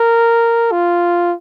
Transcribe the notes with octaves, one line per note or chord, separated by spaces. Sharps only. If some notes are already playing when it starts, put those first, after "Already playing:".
Already playing: A#4
F4